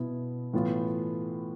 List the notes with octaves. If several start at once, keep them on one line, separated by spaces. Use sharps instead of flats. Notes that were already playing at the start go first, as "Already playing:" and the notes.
Already playing: B2 B3 E4
A2 E3 B3 F4